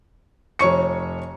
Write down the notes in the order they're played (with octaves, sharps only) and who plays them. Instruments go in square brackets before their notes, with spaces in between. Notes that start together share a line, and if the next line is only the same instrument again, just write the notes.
[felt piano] F1 C#5 C#6 C#7